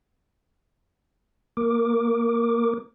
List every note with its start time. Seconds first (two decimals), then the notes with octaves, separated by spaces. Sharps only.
1.57 A#3 A#4 D6